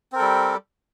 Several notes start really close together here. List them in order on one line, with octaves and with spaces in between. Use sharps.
C4 A#4 A4 G3